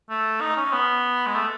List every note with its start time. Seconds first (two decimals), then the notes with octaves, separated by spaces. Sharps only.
0.09 A3
0.41 D#4
0.56 C#4
0.72 B3
1.26 G#3
1.35 A3